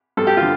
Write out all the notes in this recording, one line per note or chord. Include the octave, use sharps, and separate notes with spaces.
G2 A4
G4
D3 F4